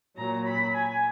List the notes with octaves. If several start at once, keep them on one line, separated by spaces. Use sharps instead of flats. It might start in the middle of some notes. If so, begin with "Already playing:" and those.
A#2 F#3 A#5
B5
G#5